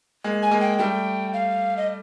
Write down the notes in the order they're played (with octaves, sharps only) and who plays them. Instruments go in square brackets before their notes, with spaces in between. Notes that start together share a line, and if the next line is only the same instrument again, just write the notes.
[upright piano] G#3 A#3
[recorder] G#5
[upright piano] G#3 A#3
[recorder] G5
[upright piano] G3 A3 [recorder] G5
[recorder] F5
D#5